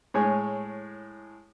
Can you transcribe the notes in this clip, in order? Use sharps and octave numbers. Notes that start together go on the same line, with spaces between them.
A2 G#3 C#5 G#5